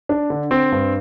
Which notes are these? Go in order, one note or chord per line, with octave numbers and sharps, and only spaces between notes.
D4
D3
C4
G2